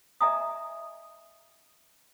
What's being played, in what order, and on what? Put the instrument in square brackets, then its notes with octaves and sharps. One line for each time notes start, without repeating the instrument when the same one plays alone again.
[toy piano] D#5 E5 G#5 A#5 D#6